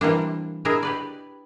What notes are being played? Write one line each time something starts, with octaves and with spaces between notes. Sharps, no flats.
C3 E3 G3 A#3 D4
D4 E4 G#4 A#4 D#5
G4 B4 D5